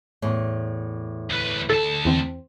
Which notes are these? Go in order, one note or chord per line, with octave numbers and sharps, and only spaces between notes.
E2 A2
D2 B4
D2 A4 A5
E2 C4